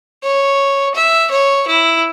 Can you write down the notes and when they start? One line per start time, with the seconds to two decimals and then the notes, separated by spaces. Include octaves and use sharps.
0.24 C#5
0.95 E5
1.31 C#5
1.67 E4